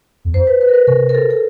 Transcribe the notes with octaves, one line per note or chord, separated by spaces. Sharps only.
E2
F2 C5
B4
B4
A#4
B4
C3 A#4
A#4
A4
A4